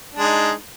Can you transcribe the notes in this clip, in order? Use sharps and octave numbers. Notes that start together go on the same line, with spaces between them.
G#3 D4 D#4